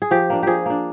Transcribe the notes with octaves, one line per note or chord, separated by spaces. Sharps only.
G#4
F3 G4
A#3 D4
F3 G4 G#4
A#3 D4